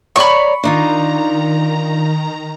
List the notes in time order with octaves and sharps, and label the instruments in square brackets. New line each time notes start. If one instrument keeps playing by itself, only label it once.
[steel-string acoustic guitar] C#5 D5 A#5 [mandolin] B5 C#6
[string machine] D#3 A#5 [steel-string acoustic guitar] D4 D#4 F4